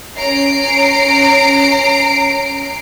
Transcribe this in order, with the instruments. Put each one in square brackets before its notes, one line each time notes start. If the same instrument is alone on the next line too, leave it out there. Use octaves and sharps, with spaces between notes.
[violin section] C#4 A#5 C7 D7